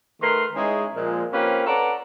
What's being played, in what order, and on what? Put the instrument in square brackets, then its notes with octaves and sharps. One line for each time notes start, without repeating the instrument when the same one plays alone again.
[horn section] D#3 A3 A#4 B4 C6
G#3 C#4 D#4 E4 G#4 C#5
A#2 F3 G#3
A#3 C4 C#4 F4 G4 B4
A4 B4 C#5 D5 F#5 A#5